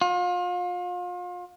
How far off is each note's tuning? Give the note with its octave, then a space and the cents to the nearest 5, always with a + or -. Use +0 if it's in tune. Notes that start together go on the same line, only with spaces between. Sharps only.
F4 +35